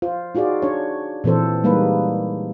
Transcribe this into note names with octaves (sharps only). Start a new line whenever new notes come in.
F4 C5
D#4 F4 F#4 G#4 D5
D4 C#5
A#2 E3 C4 A4 C5
G3 G#3 A#3 D#4 B4